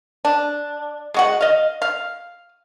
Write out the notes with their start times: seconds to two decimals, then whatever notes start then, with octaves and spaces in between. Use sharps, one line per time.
0.25 D4
1.14 G#3 F#4 F#5
1.41 D#5 F5
1.82 F5